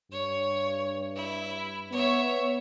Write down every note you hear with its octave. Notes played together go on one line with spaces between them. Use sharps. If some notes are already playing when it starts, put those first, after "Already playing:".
G2 C#5
E4
B3 C#5 E5